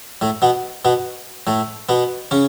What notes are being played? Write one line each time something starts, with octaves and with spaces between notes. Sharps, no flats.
A2 A3
B2 B3
B2 B3
A2 A3
B2 B3
C#3 C#4